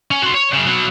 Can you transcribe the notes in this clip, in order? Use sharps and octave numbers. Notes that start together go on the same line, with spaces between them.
C#4
F#4 C6
C#5
F#2 C#3
B2 F#3